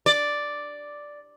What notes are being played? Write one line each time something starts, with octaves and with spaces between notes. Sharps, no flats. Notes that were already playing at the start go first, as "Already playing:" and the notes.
D5